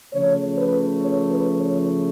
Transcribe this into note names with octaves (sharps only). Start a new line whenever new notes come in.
C#3 F3 A3 C#5
B4
C#5
B4
C#5